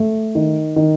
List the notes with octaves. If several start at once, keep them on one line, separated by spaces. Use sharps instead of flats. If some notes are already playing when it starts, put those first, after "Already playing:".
Already playing: A3
D#3
D#3